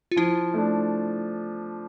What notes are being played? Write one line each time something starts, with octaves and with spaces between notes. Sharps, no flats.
F4
F3 E4
A3 D4